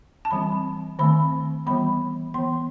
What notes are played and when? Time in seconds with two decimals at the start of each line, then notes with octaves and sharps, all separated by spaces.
0.25 A5
0.31 E3 G3 C4 B5
0.99 D#3 A3 C4 B5
1.67 E3 G3 B3 B5
2.34 E3 B3 C6